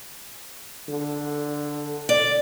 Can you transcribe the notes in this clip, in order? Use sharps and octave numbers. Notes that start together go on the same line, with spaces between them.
D3
D5